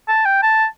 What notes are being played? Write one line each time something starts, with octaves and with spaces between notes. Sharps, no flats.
A5
G5
A5